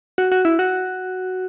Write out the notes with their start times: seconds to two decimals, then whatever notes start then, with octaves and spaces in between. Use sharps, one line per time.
0.18 F#4
0.32 F#4
0.45 E4
0.59 F#4